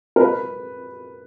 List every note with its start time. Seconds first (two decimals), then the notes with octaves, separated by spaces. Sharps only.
0.16 A#4
0.21 B4